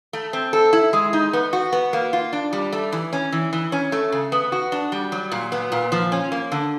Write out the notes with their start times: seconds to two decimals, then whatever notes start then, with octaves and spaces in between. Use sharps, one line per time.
0.13 A3
0.33 C4
0.53 A4
0.73 E4
0.93 G#3
1.13 D#4
1.33 B3
1.53 F#4
1.73 B3
1.93 A#3
2.13 F4
2.33 D4
2.53 G3
2.72 A3
2.92 E3
3.13 C#4
3.33 E3
3.53 E3
3.72 C#4
3.92 A3
4.12 C#3
4.32 B3
4.52 F#4
4.72 D4
4.92 G3
5.12 F#3
5.32 A#2
5.52 B3
5.72 A#2
5.92 F3
6.12 C#4
6.32 A#3
6.52 D3